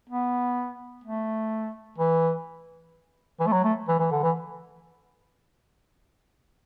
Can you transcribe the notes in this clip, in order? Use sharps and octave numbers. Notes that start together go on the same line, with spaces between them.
B3
A3
E3
E3
A3
F#3
A3
E3
E3
D3
E3